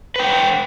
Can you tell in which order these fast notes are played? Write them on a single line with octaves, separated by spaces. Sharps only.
B4 G5 F#5